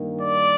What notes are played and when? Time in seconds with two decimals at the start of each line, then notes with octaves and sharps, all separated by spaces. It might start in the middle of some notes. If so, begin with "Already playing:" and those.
Already playing: G2 D#3 A#3
0.21 D5